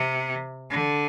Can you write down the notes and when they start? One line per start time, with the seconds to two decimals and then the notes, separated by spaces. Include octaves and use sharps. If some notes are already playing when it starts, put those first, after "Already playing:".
Already playing: C3
0.71 D3